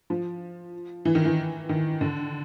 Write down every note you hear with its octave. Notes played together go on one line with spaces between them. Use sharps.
F3
E3
D#3
E3
D#3
D3